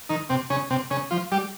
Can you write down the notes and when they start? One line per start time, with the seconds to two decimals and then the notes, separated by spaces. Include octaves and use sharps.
0.09 D#3 D#4
0.29 C3 C4
0.50 C#3 C#4
0.70 C3 C4
0.91 C#3 C#4
1.11 F3 F4
1.32 G3 G4